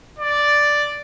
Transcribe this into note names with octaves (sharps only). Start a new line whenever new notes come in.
D5